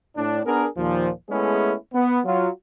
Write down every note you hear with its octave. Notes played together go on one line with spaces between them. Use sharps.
A2 D4
B3 D4 G#4 A#4
D#2 A#2 F3
G#3 A3 B3 C#4 E4 G#4
B3
F#3 F4